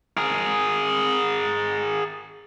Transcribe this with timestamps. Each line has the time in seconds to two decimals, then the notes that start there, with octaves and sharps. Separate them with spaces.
0.17 G#4 A#4